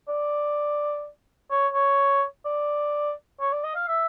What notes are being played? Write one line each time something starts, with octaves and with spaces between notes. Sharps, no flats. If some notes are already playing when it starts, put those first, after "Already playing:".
D5
C#5
C#5
D5
C#5
D5
D#5
F5
E5